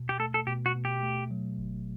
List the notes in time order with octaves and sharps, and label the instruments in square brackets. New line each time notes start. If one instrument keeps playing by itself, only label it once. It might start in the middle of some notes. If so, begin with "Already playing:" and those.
Already playing: [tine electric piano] B2
[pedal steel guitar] G4
[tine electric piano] A3 [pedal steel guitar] A4
[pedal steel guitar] A4
[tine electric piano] B2 [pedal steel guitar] G4
[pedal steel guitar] F#4
[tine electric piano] B2
[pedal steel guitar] G4
[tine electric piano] A3
F#3
G1